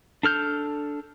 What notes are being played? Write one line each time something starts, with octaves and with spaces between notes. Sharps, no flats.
D4 A4 F6 G6